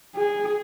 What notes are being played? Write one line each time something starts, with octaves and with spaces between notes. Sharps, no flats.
G#4